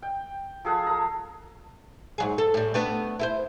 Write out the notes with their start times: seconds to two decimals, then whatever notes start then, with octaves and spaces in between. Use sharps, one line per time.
0.02 G5
0.65 F3 G#4 A4 F#5
0.87 A4 A#5
2.18 G#2 F#3 G#4
2.38 A4
2.54 A2 G3
2.74 A3 B3 D4
3.19 E4 A4 C5